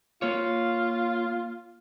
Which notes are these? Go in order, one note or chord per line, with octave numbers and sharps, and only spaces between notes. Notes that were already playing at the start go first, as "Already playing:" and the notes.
A#3 F4 C#5